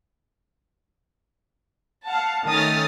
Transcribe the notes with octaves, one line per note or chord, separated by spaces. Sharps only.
F5 F#5 A5
D#3 A3 C#4 D#6 F6 A6